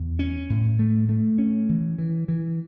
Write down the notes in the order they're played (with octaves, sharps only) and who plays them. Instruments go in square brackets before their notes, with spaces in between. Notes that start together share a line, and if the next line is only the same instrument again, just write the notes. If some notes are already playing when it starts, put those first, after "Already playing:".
Already playing: [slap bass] E2
C#4
A2
A3
A3
C#4
E3
E3
E3